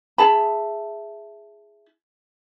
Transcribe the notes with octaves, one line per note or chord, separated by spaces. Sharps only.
E4 G#4 A5 B5